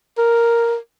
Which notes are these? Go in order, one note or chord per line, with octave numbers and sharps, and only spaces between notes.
A#4